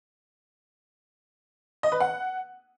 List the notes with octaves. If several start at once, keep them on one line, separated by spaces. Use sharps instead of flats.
D#5
B4
F#5